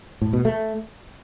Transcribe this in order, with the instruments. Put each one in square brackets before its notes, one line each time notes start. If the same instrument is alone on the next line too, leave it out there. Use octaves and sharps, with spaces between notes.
[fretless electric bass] A2
B2
A3